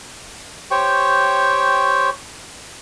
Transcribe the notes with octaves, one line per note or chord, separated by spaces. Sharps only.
G4 C5 C#5 G5 C#6